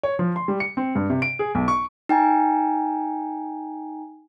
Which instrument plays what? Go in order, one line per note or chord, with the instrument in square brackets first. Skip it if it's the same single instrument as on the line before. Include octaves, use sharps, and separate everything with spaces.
[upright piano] C#5
F3
C6
G3
C#7
C4
G2
C3
D7
G#4
B1
C#6
[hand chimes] D#4 G5 G#5 A#5